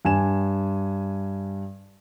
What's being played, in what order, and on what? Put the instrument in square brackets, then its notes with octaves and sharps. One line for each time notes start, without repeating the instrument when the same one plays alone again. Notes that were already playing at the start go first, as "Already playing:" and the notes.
[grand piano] G2 G#5 E7